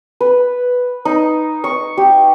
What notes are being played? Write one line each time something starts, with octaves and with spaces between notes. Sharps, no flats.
B4
D#4
C#6
G4